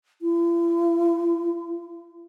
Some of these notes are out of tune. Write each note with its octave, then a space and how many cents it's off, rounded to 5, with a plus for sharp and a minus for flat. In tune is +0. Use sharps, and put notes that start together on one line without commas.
E4 +45